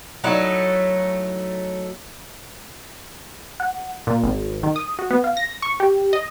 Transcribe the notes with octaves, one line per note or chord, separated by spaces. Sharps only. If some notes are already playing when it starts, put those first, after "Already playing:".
F#3 A3 D#4 E4
F#5
A#2
G#1
D#3
D#6
F#4
B3
F5
A#6
C#6
G4
D#5